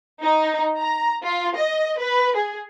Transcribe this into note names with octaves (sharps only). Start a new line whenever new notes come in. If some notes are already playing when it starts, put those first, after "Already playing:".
D#4
A#5
F4
D#5
B4
G#4